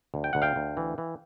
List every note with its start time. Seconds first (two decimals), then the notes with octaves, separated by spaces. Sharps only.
0.14 D2
0.24 G5
0.33 D2 F#5
0.42 F5 G5
0.56 D2
0.77 E3
0.98 E3